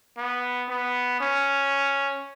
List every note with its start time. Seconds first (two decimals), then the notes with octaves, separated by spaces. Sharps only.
0.17 B3
0.69 B3
1.20 C#4